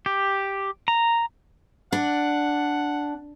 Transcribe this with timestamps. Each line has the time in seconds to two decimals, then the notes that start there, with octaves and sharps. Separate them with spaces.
0.06 G4
0.88 A#5
1.92 D4 F#5